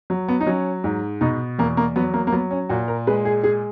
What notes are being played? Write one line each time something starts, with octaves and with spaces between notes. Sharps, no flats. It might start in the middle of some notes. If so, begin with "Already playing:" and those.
F#3
B3
D#4
F#3 C#4
G#2
B2 D#4
E2 A#3
A#3
F#3 B3
A#3
A#3
F#3 B3
C#4
A#2 F#4
A#4
G#3 B4
G#4
G#3 G#4